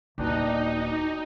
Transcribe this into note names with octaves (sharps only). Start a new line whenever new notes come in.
D#1 B2 D4 D#4 G4